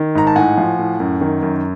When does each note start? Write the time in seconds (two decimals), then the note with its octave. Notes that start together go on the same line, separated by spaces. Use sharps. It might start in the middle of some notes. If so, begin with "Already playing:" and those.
Already playing: D#3
0.15 G#2 A#5
0.27 A5
0.36 A2 F#5 G#5
0.57 F3
0.79 A2
1.00 F#2
1.21 D#3
1.43 F#2